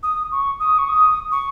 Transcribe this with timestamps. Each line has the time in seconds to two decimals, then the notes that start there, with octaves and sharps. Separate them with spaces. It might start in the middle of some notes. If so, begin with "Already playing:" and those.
0.03 D#6
0.31 C#6
0.59 D#6
0.78 C#6
0.89 D#6
1.32 C#6